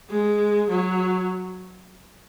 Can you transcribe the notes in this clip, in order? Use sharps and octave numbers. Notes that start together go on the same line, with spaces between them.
G#3
F#3